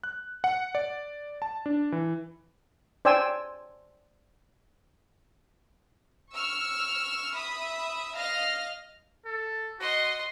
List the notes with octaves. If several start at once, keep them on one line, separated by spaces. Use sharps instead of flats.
F#6
F#5
D5
A5
D4
E3
C5 D5 G5 G#5 E6
C#6 E6 F6
E5 B5 D#6
D#5 F5 F6 A#6
A4
F#4 D#5 C6